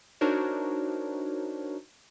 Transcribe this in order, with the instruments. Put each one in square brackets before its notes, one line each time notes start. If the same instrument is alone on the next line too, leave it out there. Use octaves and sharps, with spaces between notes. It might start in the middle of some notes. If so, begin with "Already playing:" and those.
[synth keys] D4 D#4 F#4 A#4 C5 C#5